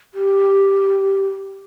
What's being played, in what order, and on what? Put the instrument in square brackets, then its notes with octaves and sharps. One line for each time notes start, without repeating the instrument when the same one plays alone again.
[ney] G4